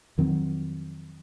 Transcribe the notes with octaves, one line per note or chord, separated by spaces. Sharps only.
F2 D#3 F#3 C4